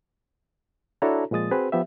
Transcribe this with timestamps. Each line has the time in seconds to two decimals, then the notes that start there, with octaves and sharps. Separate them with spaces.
1.02 D4 E4 F#4 A4 C#5 A#5
1.31 A#2 F3 G#3 D#6 A6
1.51 C4 F#4 G#4 B4 C5
1.72 F3 B3 G4 E5